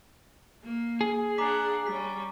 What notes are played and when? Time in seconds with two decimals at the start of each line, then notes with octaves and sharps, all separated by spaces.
0.63 A#3
1.01 G#4
1.38 D4 F#5 A#5 D6 B6
1.87 G3 C#4 B6